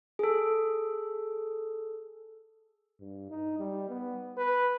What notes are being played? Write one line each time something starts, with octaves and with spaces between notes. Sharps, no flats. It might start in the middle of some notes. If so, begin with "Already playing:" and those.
G#4 A4
G2
D#4
G3
B3
B4